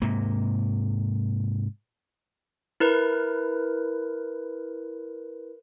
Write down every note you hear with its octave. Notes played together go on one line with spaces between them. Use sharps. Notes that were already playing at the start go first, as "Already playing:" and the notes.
G#2 C3 A#3
E4 A#4 B4